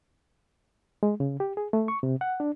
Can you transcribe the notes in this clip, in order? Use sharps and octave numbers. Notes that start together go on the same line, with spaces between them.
G#3
C#3
G4
G#4
A3
C#6
C3
F#5
D4